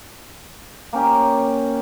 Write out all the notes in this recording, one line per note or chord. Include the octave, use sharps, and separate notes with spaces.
A#3 C#4 G4